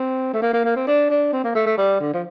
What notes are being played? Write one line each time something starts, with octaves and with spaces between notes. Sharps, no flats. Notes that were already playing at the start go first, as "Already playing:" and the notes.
Already playing: C4
A3
A#3
A#3
A#3
C4
D4
D4
C4
A#3
A3
A3
G3
D3
F3